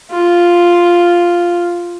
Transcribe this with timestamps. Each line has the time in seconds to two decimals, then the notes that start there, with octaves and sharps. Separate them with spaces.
0.11 F4